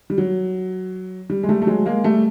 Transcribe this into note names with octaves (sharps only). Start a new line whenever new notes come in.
G3
F#3
G3
G#3
G3 A3
A3
F#3 G#3
G#3 A#3
G3 A3